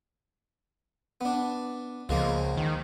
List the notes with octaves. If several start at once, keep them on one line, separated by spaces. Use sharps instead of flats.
B3 D4
C#2 F3 G#3 A#3
D#3